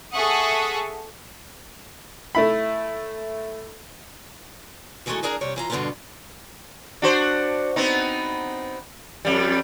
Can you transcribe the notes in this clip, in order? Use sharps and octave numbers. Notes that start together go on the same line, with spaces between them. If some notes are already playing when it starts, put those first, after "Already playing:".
G#4 A4 E5 F#5 C#6 D#6
A3 E4 B5
D#3 E3 G#3 A3 F#4 A4
E2 D4 G#4 A#4 A#5
C3 G3 C#5 D5
E3 F4 A#5
G2 B2 D3 G#3 B3 F4
D4 F#4 C5
B3 C4 D#4
F2 G3